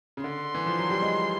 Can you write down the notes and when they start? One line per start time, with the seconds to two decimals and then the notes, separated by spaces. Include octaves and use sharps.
0.17 C#3
0.24 D3 C6
0.55 E3
0.66 F3
0.79 F#3
0.91 G3
1.02 G#3